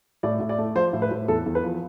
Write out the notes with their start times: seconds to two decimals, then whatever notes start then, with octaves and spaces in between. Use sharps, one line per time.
0.23 A2 D5
0.40 A2
0.49 D5
0.58 A3
0.75 F3 C5
0.93 A2
1.02 B4
1.11 A2
1.28 E2 A4
1.46 E2
1.55 B4
1.64 F3